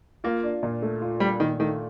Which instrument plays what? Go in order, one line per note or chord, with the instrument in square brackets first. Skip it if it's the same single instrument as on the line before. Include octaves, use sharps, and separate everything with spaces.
[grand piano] A#3 [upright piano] F4
[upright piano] D4
A#2
A3
F4
[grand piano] G3 [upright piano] D4
[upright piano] A#2 [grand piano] D#3
[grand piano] D#3 [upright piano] A3